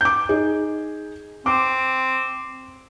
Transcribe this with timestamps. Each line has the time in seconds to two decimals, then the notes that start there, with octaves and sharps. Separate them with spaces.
0.01 D6 G6
0.29 D#4 G#4
1.46 C4 D6